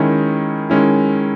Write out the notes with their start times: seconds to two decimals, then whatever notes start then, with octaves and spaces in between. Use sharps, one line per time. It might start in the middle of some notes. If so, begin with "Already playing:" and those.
Already playing: D#3 G#3 C#4 E4
0.70 D#3 G#3 C#4 E4